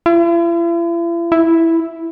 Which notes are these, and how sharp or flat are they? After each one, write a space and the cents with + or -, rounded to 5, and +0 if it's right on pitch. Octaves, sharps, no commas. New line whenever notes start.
E4 +45
E4 +0